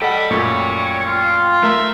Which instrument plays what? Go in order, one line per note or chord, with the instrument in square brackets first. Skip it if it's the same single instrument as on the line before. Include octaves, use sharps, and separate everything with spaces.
[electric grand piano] A4 D#5 F#5 [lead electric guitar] D5 G5 [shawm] B5
[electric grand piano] F#2 A#2 A3 [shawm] C#5
[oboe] F4
[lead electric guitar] A3 [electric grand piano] A#4 A#5 [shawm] E5